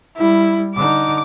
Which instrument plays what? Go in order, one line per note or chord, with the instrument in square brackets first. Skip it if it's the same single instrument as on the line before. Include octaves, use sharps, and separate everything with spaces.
[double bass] G3 [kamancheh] E4
[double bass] D3 D#4 [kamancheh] D6